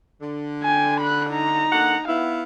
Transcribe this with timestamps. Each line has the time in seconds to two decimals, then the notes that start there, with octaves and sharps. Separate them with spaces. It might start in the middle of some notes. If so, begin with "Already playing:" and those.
0.21 D3
0.63 G5 G#5
1.00 B5 F#6
1.31 D#4 A#5
1.71 D3 A#3 F#5
2.08 B3 E4 F5